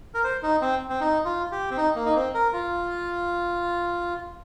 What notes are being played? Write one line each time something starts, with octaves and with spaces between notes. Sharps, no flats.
A#4
C5
D#4
C4
C4
D#4
F4
G4
C4
D#4
A#3
D#4
C4
A#4
F4